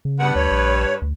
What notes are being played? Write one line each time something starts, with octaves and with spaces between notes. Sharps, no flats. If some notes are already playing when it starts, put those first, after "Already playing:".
C#3
G2 B3 B4 F#5
D2 C#5
A#1
D2